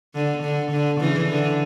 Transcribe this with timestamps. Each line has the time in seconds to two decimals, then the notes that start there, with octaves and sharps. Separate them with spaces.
0.14 D3
0.43 D3
0.71 D3
1.00 C#3 E3
1.29 D3